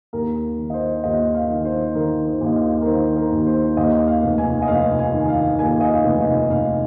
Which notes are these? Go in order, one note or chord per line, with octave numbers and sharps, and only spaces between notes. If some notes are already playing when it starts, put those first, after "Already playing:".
D#2 A#4
D#3
D#5
C5
D#2 D#5
F5
D#3
C5
D#3 A#4
C5
D#2
D#5
F5
A#4
D#3 C5
A#4
D#2
C5
D#2 D#5
F5
F1
G#5
D#5
F1 F5
G#5
D#3
F5
D#2 G#5
D#5
F5
F1
D#5
F1 F5